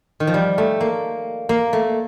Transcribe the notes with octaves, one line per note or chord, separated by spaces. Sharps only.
D#3
F3
G3
A3
A#3
A#3
A3